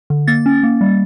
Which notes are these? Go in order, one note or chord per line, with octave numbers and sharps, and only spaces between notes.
D3
A#3 A6
C#4
A#3
G3